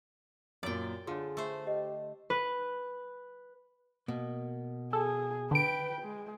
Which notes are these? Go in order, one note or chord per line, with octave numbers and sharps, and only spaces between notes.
F#2 A#2 D5 G5
D3 F4 G#4 C#5 C6
A3 C5
G4 D#5
B4
B2 A#3
G#4 A4
D3 B4 G5 D7
G#3